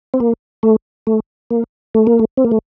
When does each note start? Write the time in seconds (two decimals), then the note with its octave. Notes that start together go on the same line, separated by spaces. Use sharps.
0.14 C4
0.20 A#3
0.63 A3
1.07 A3
1.51 A#3
1.95 A3
2.07 A#3
2.19 A3
2.37 C4
2.45 A#3
2.51 A3